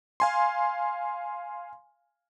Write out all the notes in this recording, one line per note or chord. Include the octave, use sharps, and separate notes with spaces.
F5 G#5 C6